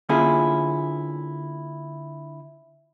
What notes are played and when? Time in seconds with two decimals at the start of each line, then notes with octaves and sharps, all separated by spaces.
0.09 D3 A#3 C#4 E4 F4 G#4